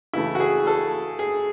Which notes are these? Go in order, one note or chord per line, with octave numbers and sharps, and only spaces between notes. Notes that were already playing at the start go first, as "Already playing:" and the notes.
C#3 E3 A3 E4
F#4
G#4
A4
G#4